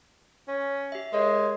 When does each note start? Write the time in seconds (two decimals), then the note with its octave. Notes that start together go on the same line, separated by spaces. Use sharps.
0.48 C#4
0.92 G4 E5
1.13 G#3 A#4 C#5